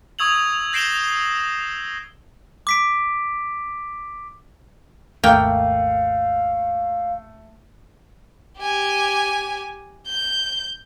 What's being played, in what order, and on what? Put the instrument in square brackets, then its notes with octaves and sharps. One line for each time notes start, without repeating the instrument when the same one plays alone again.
[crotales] C#6 D#6 E6 G#6 F7 F#7
G6 A#6 C7 D7 E7 G7
[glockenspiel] D6 B6 D7
[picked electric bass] G#1 D#2 [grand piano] A3 [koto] A#3 G5 [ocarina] F5
[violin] G4 G#5
G6